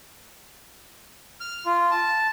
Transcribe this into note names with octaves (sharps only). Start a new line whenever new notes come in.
F6
F4
A5